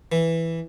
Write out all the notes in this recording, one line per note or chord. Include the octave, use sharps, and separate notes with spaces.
E3